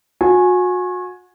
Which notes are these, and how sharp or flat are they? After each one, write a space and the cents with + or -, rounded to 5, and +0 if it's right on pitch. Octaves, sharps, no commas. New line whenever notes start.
F#4 -35 G#5 +5